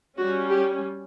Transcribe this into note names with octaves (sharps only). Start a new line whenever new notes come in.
G3 C#4 F#4
G4